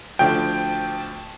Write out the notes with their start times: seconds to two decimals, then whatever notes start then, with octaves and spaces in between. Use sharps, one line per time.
0.19 D1 D2 D3 F3 G5 A5